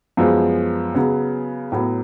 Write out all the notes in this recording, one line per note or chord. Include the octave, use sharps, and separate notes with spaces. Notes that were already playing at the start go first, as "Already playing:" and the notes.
F#2 F3 G#3 B3
C#3 F#3 B3
A2 F#3 B3